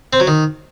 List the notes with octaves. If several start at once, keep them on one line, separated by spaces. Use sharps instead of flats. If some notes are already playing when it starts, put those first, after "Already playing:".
C4
F#3
D#3